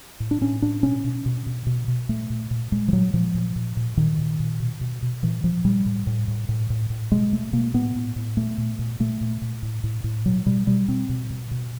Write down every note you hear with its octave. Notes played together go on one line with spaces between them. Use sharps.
A2
D4
A2 C#4
A2 D4
B2 C#4
B2
B2
B2
B2
B2
A#2 A3
A#2
A#2
A#2 G#3
F3
A#2 F#3
A#2 F3
A#2
A#2
A#2
A#2 D#3
A#2
A#2
B2
B2
B2
A#2 E3
A#2 F3
A#2 G3
A2
A2
A2
A2
A2
A2
B2 G#3
B2 A3
B2 A#3
A2 B3
A2
A2
A#2 A3
A#2
A#2
A#2 A3
A#2
A#2
A2
A2
A2
B2 F#3
B2 G3
B2 G3
B2 C4
B2
B2
B2